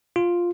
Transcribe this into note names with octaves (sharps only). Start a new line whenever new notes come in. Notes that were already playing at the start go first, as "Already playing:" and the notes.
F4